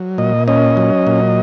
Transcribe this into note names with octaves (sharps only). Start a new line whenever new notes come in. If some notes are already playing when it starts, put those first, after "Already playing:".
Already playing: F#3
A#2 D#5
C#4 D#5
F#3
A#2